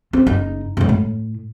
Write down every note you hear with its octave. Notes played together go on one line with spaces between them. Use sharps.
C4
F#1 D#4
E1 C3
A2